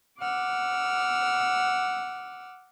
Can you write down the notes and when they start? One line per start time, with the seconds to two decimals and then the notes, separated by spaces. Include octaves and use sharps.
0.20 F#5 D6 E6 F6